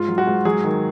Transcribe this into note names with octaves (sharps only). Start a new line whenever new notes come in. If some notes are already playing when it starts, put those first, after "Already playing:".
Already playing: G#2 F4
F#3
F#4
G#2
F#3 G#4
D#3